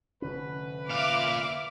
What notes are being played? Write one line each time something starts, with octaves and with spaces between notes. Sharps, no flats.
F1 D3 C#4 B4
A#2 E5 F5 D6 F6